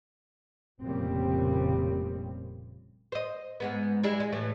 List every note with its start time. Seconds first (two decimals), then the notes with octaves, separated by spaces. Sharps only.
0.82 F1 A#2 C#3 G3 C4
3.12 C5 D#5
3.60 G#2 G#3 B3
4.04 G3 G#3 E4
4.20 G#3
4.32 A2 E3 A3